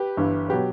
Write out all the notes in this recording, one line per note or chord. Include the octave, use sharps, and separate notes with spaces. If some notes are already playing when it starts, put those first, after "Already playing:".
Already playing: G4 B4
G1 G2 E3
B2 F#3 G4 B4